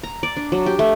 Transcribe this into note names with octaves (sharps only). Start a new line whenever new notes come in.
A#5
D5
D4
F#3
G4
A3